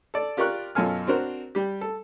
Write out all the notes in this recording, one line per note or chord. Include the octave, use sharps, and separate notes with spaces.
A4 D5
F4 G4 A#4 D5 C#6 F#6
F#2 B2 F4 A4 G#5 F6
C4 D4 F#4 A#4 C5
G3 G4
A4